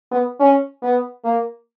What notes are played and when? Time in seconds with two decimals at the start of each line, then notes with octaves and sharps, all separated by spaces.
0.12 B3
0.40 C#4
0.83 B3
1.24 A#3